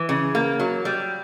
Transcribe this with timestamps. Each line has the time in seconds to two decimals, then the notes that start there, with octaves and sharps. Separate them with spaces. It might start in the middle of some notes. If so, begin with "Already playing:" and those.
Already playing: E3
0.09 C#3
0.35 A#3
0.60 F#3
0.85 G3